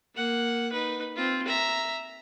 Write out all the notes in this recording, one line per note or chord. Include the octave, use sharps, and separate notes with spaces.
A#3 F#5
D#4 B4
C4 F4
E5 A#5